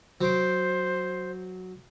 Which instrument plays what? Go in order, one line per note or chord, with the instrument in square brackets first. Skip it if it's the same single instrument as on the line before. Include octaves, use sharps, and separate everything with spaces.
[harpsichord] F#3 D6 [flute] C5